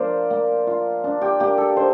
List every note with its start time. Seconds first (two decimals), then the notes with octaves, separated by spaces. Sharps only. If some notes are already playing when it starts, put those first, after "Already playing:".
Already playing: F3 A#3 D4 C5 D5 F5
0.30 A#3
0.67 F4
1.04 D4
1.21 G4
1.40 A#3 G4
1.58 A4
1.76 D#4 C5